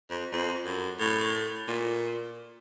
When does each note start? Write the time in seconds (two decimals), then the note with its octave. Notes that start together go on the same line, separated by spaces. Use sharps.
0.10 F2
0.32 F2
0.66 F#2
1.00 A2
1.68 A#2